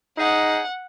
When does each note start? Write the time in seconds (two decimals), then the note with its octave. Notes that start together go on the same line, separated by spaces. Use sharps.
0.18 D#4 G#4 F#5